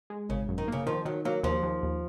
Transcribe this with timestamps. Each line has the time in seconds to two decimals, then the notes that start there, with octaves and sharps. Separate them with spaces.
0.10 G#3
0.29 G#1 C#3
0.48 F#2
0.58 D#3
0.68 C#3 A#3
0.86 D#3 F3
1.05 D#3 F#3
1.25 F#3 A#3
1.43 D#2 F3
1.63 D#2
1.83 D#2